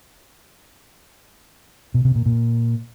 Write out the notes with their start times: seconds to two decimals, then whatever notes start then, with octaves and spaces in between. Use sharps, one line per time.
1.94 B2
2.05 C3
2.15 A#2
2.26 A#2